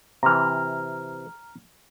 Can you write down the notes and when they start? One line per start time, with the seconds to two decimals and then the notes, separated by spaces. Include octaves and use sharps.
0.23 C3 E3 A#5 F6